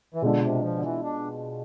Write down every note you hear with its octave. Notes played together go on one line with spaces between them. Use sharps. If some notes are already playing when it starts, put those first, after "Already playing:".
E3
B2 D3 G#3 D4 F4
C3
F3
D3
E3
D4